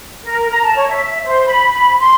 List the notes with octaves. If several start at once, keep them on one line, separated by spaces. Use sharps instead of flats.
A#4
A#5
A5
C#5
E5
C5
B5
B5
C6